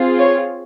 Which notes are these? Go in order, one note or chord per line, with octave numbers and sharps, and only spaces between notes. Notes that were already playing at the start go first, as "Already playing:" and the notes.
Already playing: C4 F4 G#4
C#5